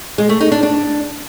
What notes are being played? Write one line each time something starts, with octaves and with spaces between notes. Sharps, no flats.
G#3
A3
D#4
D4
D4